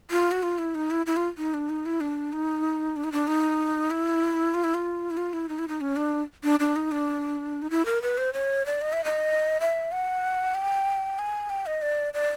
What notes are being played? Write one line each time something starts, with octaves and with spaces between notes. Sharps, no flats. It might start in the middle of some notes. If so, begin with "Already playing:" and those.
F4
F#4
F4
E4
D#4
E4
E4
F4
D#4
D4
D#4
E4
D4
D#4
D4
D#4
D4
D#4
E4
F4
E4
F4
E4
F4
E4
D#4
E4
D#4
C#4
D4
D4
D4
D#4
D4
D#4
E4
A#4
B4
C5
C#5
D5
D#5
E5
D#5
E5
F#5
G5
G#5
G5
D#5
D5
D5